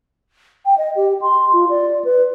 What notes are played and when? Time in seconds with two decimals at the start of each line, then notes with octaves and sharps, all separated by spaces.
0.66 G5
0.78 D#5
0.96 G4
1.21 C6
1.53 F4
1.70 D5
2.04 B4